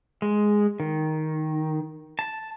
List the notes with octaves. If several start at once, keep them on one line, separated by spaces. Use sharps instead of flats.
G#3
D#3
A5